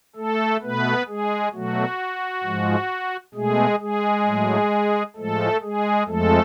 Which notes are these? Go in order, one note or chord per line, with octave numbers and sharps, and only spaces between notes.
A3 A4
B2 A3 B3 B4
G#3 G#4
B2 F#3 A3 F#4
G#2 F3 G#3
B2 G#3 A3 G#4
G#3 G#4
A2 F#3 A3
A2 F3 G#3 A3 A4
G#3 G#4
F2 F3 G#3 A3 A4